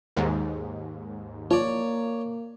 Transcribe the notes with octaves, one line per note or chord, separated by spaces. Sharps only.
D#2 G#2
F3 A#3 C#5 D5